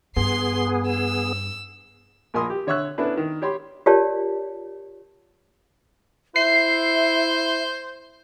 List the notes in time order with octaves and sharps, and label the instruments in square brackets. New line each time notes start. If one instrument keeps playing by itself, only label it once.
[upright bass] G2 [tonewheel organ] B3 G#4 [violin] C6 C7
[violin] E6
[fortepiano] A#1 A#4 G#5 B5 C6 D#6
G4
D3 C#5 E5 C#6 E6 F#6
B3 C#4 D4 E4 A4 B4
D#3 A#4
G4 C#5 B5 C6
[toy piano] F4 G4 A#4 C#5 D5 A5
[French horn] E4 [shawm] C5 [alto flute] E5 [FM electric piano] C7